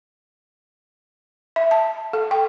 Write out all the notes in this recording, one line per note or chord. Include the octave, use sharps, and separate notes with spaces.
E5
A5
A4
G5